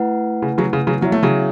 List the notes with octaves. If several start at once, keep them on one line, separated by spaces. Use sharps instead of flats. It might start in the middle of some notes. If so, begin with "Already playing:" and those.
Already playing: A3 E4 B4 F#5
C#3
C#3 F#3
C#3
C#3 F#3
F#3 B3 E4 C#5 E5
A3
C#3 F#3